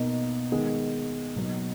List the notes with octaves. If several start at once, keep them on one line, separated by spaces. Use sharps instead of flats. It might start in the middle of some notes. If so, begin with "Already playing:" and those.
Already playing: B2 A#3 D#4
D#3 G#3 B3
B2 F#3 A#3 D#4